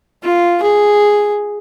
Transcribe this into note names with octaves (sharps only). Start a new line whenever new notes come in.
F4
G#4